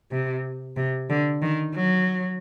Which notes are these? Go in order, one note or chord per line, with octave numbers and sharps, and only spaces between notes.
C3
C3
D3
D#3
F#3